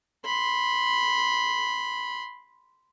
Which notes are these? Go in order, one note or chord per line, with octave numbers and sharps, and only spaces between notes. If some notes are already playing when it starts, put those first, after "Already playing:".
B5 C6